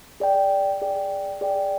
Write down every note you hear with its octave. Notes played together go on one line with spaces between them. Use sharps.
G#4 D5 G5
G#4 D5 G5
G#4 D5 G5